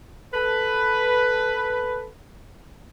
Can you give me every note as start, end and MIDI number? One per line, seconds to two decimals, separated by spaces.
0.34 2.08 69
0.34 2.08 71